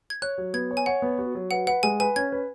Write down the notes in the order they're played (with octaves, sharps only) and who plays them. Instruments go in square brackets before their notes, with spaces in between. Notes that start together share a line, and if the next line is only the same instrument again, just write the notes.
[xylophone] G#6
[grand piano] C#5 [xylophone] F#6
[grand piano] F#3
[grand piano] B3 [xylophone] G#6
[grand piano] C#5
[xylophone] G#5
[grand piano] C#5 [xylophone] F#5
[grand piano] B3
F#4
F#3
[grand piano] B4 [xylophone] F#5
[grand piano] B4 [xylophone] F#5
[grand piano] G#3 [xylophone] G#5
[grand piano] B4 [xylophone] G#5
[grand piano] C#4 [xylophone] G#6
[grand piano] B4